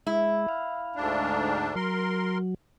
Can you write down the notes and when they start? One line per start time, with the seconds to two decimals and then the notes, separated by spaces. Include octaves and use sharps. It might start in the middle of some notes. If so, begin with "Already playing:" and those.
0.07 G#3 E4
0.49 F5
0.96 D2 G#2 D4
1.75 F#3 A#4 C6